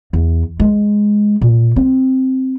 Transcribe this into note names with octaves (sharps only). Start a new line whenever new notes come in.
E2
G#3
A#2
C4